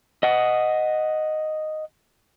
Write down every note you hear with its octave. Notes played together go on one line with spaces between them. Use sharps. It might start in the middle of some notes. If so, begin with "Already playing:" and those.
D#5 F#5